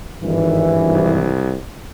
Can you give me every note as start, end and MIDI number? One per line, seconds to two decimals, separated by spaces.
0.23 1.31 32
0.23 1.31 43
0.23 0.67 51
0.23 1.31 52
0.88 1.54 36